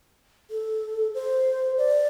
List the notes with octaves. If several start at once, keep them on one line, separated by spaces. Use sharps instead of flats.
A4
C5
D5